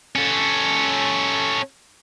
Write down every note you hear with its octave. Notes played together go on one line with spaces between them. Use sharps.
C#4 A4